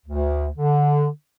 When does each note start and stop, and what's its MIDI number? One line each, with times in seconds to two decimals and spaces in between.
0.06 0.47 38
0.57 1.07 50